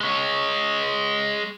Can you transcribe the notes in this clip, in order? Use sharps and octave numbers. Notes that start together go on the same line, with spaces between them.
G#3 C#5